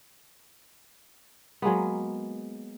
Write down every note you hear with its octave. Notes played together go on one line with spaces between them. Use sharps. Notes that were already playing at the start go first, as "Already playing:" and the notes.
F#3 G#3 A#3 B3